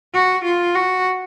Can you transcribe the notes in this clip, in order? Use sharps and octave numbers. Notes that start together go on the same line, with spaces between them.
F#4
F4
F#4